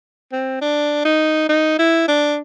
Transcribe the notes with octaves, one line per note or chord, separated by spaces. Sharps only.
C4
D4
D#4
D#4
E4
D4